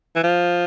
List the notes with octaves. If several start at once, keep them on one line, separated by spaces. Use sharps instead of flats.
E3
F3